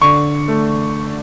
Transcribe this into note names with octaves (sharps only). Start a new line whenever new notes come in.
D3 C#6
A3